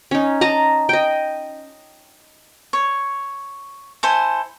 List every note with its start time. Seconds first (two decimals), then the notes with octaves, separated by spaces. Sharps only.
0.11 C#4 D#4
0.41 D#5 A5 A#5
0.89 D#5 G5
2.73 C#5
4.03 E4 A4 C5 G#5